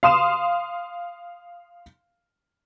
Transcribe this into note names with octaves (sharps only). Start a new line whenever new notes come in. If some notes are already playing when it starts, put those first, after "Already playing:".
F5 C6 D#6 E7